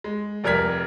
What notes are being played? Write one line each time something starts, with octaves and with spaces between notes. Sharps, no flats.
G#3
F1 G3 A#4 F6 G#6 B6